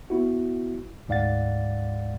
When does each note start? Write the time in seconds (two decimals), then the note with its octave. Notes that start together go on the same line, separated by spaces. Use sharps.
0.10 B3 E4 F#4
1.08 D2 G#2 D5 F5 F#5 A6